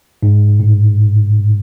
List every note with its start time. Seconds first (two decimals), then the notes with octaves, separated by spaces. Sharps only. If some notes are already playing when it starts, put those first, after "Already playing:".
0.23 G#2
0.60 A2